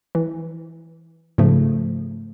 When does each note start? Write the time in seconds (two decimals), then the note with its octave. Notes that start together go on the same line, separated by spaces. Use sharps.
0.15 E3
1.38 G#2 C#3 F3 A3